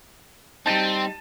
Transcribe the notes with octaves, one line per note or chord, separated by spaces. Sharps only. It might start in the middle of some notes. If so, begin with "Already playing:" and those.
G3 C4 D#4 A5 A6 D#7